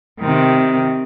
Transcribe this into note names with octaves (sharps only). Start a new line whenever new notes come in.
C3 D#3